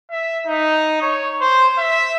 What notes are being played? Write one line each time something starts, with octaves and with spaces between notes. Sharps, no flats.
E5
D#4
C#5
C5
E5